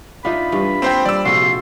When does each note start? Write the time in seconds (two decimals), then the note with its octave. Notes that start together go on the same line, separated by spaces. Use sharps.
0.25 D4 D#4 F4 E5 F5 B5
0.52 G2 E3
0.82 A#3 C4 F4 C5 G5
1.05 G3 D5 E6
1.25 A#1 C3 F4 F#4 A4 C6